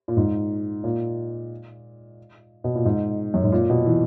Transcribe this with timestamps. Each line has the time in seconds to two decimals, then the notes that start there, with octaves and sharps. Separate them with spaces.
0.08 A#2
0.17 G#2
0.84 A#2
2.64 B2
2.75 A#2
2.85 G#2
3.34 F#2
3.44 G#2
3.52 A#2
3.70 B2
3.86 E3